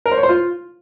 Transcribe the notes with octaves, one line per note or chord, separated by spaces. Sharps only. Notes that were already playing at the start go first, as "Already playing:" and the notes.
A#4
C5
C#5
C5
F4